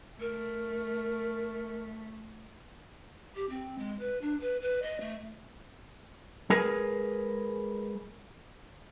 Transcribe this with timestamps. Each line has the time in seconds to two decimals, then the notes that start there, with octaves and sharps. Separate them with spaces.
0.20 A3 A#4
3.35 G4
3.49 C4
3.78 G#3
3.99 B4
4.21 D4
4.40 B4
4.61 B4
4.82 D#5
5.00 A3
6.50 G#3 G#4 A#4 B4